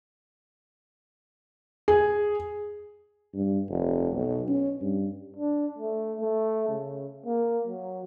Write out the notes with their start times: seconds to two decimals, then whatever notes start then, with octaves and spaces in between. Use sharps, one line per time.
1.88 G#4
3.34 G2
3.69 F1
4.13 B1
4.48 C#4
4.81 G2
5.37 D4
5.79 A3
6.21 A3
6.69 C#3
7.26 A#3
7.67 F#3